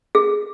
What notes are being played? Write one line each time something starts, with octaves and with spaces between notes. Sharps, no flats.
G#4